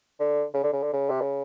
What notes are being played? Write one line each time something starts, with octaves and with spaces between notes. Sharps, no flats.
D3
C#3
D3
C#3
D3
C#3
C3
C#3